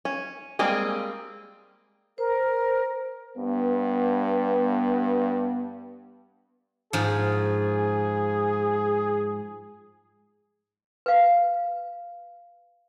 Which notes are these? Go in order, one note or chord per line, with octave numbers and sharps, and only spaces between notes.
C#4
G3 G#3 A#3 C4 G#4
A#4 C5
G2 B3
G#2 F3 G#4
B4 F5